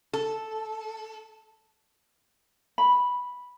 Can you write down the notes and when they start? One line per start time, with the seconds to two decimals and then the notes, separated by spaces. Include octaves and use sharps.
0.13 A4
2.78 B5